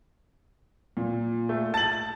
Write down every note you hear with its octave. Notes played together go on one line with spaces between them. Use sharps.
A#2
A3
A5 A6 F#7